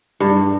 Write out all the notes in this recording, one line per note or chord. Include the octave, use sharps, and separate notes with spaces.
G2